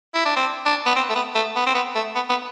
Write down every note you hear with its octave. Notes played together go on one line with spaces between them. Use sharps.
E4
D4
C4
D4
B3
C4
A3
B3
A3
B3
C4
B3
A3
B3
B3